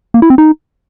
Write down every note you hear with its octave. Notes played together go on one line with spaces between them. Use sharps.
A#3
E4
C4
D#4